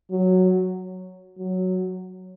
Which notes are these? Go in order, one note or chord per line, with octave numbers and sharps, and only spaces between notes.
F#3
F#3